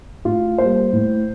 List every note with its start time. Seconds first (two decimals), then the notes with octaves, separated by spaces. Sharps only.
0.25 A2 F4
0.58 G3 A#3 C5
0.93 A2